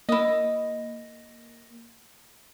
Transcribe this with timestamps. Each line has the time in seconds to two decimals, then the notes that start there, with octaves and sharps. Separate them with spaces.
0.09 A#3 E4 D#5